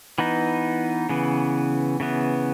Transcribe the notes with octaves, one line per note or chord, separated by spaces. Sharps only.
E3 B3 D#4
C#3 E3 B3
C#3 E3 B3